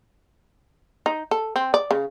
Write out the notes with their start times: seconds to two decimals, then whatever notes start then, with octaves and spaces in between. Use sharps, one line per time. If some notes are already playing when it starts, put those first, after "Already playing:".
1.06 D#4
1.31 A4
1.56 C4
1.74 D5
1.91 C#3